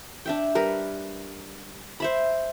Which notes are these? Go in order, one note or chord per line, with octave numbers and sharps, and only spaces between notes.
D4 E5 G5
G3 A#4 B4
C5 E5 B5